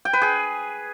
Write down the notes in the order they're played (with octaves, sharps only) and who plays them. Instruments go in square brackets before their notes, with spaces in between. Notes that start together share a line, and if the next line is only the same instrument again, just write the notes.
[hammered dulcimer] G5
B4
G#4